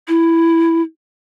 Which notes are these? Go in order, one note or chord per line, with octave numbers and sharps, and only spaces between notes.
E4